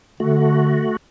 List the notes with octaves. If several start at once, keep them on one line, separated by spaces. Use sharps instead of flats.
D3 A3 F#4